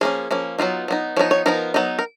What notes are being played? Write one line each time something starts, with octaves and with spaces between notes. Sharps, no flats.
F3 A#3 C#4 G#4
F3 A#3 C#4
F#3 B3 D#4 F4
F#3 B3 D#4
F3 B3 D#4 C#5
C#5
F3 B3 D#4 A#4
F#3 B3 D#4
A#4